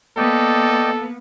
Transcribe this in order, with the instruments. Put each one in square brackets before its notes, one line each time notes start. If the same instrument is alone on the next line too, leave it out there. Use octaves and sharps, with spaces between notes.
[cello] A#3 B3 [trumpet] A4 [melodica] D5 D#5 G5